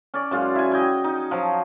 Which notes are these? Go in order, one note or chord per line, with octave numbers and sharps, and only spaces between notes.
C#4 D5
F#2 G#3 F4
E4 G#5
D#5 G5 G#5
D#4
F3 F#3